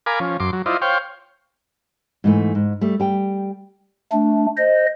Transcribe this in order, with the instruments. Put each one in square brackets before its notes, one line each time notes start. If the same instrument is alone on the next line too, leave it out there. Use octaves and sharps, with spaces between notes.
[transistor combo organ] A#4 F5 G#5 B5 D6
F3 C#4
F#2 C6 D6
F#3
E4 F4 C5 D5 D#5
C5 C#5 F5 G5
[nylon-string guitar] G#2 E3 A3
G#2
G3 A3
G3 G5
[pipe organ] A3 D4
C5 D#5